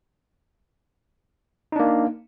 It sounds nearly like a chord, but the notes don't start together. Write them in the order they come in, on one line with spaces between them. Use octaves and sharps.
D#4 D4 A#3